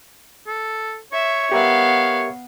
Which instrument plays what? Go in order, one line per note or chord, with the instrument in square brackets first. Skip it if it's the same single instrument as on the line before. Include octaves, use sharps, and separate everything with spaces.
[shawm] A4
[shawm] C#5 [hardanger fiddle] E5
[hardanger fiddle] B3 F5 [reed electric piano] G4 A#4 E5